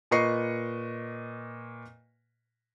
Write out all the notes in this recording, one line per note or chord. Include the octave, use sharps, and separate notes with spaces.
A#2 B4 D#5 C#6 C7 C#7